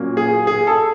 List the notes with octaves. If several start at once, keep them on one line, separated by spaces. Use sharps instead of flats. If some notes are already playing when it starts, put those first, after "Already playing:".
Already playing: A#2 F#3 A#3 C#4
G#4
G#4
A4